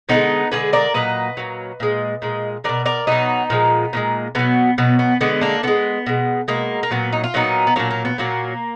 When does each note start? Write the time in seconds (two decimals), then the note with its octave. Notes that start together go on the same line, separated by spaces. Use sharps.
0.09 D3 F3 G#3 B3 D#4
0.51 D3 F3 G#3 G#4 B4
0.73 A#4 D5
0.94 A#2 F#3 B4 D#5
1.37 A#2 F#3
1.80 A#2 G#3
2.22 A#2 G#3
2.64 B2 F#3 A#4 D5
2.85 A#4 D5
3.07 B2 F#3 B3 D#4
3.50 A#2 F3 G#3
3.93 A#2 F3 G#3
4.35 B2 F#3 B3
4.78 B2 F#3 B3
4.99 B3
5.21 D3 G#3 B3
5.41 A#3 D4
5.63 D3 G#3 B3
6.06 B2 G#3
6.48 B2 G#3 A#3
6.83 A#3
6.91 A#2 F#3 B3
7.12 D#4
7.24 F4
7.34 A#2 F#3 B3 D#4
7.67 B3
7.76 A#2 F#3 A#3 D4
7.91 A#3
8.05 B3
8.18 A#2 F#3 A#3